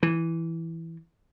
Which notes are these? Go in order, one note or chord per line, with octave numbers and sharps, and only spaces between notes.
E3